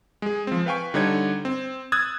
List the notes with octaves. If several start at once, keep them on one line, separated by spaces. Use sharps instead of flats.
G#3 G#4
F3 C4
B4 F5 G5 G#5 C#6
D3 G3 D#4 C#5 G#6
C4
D#6 E6 F#6 G#6 A6